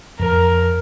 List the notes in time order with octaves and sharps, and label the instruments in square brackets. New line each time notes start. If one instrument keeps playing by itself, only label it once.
[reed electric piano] F2 [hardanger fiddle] A#4